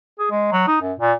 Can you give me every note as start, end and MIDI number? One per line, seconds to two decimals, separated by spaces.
0.19 0.29 68
0.31 0.49 56
0.52 0.63 54
0.68 0.78 63
0.82 0.93 42
0.99 1.13 46